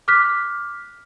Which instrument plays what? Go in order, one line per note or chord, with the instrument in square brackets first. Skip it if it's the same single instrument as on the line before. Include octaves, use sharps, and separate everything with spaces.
[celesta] D6 F6 F#6 B6